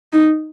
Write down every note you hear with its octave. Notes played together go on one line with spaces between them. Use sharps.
D#4